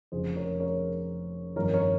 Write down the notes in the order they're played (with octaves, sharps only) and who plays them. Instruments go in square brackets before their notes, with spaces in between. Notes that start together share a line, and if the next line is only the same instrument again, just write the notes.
[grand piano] F1 F2 C#3 G#4 C5
A#4 C#5
A#4 C#5
G1 F2 D#3 A#4 C#5
A#4 C#5